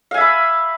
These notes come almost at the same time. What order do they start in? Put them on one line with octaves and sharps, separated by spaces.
F5 G#5 E5 B5